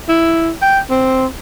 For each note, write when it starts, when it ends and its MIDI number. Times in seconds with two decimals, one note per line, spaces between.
0.08 0.51 64
0.62 0.80 79
0.90 1.26 60